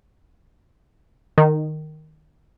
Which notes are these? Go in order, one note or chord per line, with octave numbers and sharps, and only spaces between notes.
D#3